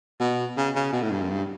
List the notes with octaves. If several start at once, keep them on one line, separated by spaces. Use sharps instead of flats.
B2
C#3
C#3
B2
A2
G2
F#2
G2